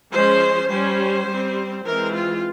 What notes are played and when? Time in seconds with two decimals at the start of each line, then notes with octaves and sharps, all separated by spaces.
0.12 F3 G#3 C#4 C5
0.70 G3 C#4 C5
1.28 G3 C4
1.85 E3 G#3 C4 A#4
2.14 F4